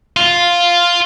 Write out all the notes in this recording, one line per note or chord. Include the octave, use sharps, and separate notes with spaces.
F4